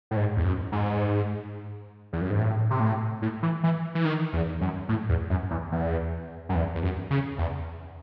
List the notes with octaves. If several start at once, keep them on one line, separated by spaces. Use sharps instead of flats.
A2
G#2
E2
F#2
G#2
E2
F#2
G#2
A2
C3
A2
A2
E3
E3
E3
D#3
E2
F#2
A2
E2
F#2
E2
E2
F#2
E2
E2
F#2
C#3
E2